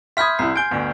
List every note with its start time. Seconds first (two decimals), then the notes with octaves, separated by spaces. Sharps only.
0.17 E5 B5 C6 D#6 F6 G6 G#6 B6
0.39 C2 E4 C7
0.56 G#5 G6 D7
0.71 G1 D2